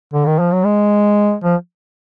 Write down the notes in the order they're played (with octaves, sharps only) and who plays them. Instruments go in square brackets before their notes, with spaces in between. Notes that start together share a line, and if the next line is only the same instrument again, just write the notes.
[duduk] D3
D#3
F3
F#3
G#3
F3